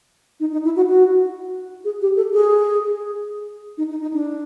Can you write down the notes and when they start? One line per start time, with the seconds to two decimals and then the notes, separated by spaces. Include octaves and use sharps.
0.40 D#4
0.52 D#4
0.65 E4
0.76 F#4
0.89 F#4
1.85 G#4
2.01 G4
2.17 A4
2.33 G#4
3.78 D#4
3.90 D#4
4.02 D#4
4.14 D4